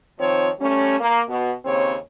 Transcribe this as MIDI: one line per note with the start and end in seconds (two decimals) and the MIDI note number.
0.19 0.49 51
0.19 0.49 53
0.19 0.49 60
0.19 0.49 73
0.60 0.99 55
0.60 0.99 57
0.60 0.99 61
1.00 1.21 58
1.29 1.52 47
1.65 1.95 39
1.65 1.95 49
1.65 1.95 60
1.65 1.95 73